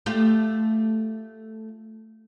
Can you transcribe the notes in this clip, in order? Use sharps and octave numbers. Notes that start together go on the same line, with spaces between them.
A3 F4 G4